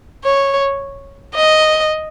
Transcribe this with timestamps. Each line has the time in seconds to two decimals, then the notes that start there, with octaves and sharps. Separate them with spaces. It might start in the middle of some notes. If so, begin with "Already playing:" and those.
0.25 C#5
1.35 D#5